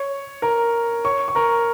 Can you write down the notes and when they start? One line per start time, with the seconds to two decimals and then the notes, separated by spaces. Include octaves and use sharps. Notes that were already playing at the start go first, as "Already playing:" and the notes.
Already playing: C#5 C#6
0.42 A#4 A#5
1.04 C#5 C#6
1.28 C#6
1.35 A#4 A#5